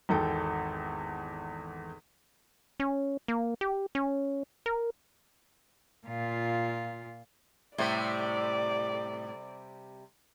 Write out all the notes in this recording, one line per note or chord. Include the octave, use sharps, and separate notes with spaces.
G#1 E2 A4 G5
C#4
A#3
G4
C#4
A#4
A#2 F4
A2 C3 G3 C5 D5